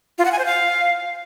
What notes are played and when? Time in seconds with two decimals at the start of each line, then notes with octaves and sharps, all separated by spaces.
0.18 F4
0.25 F#5
0.32 G#5
0.39 C5
0.45 F5